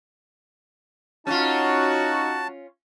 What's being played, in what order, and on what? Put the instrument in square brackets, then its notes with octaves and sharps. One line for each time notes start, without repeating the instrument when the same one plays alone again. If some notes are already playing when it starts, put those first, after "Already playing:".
[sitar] C#4 F4 [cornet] D#4 [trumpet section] F#4 [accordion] A5